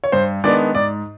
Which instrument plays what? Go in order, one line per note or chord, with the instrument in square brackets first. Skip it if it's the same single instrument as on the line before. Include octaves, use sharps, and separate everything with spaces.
[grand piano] C#5
G2 C5
D#3 G#3 B3 D4 D5
G#2 D5